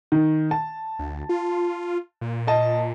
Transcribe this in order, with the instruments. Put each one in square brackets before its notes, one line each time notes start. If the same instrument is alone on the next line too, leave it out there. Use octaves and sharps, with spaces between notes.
[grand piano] D#3
A5
[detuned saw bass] D2
F4
A#2
[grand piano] D#5 A5